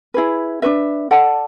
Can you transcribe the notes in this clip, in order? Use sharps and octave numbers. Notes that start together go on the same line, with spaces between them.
E4 G#4 B4
D4 F#4 B4 E5
A4 D5 F#5 A5